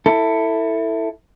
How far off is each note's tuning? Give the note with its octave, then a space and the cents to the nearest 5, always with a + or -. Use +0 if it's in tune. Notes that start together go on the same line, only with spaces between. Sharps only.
E4 +0 A4 +20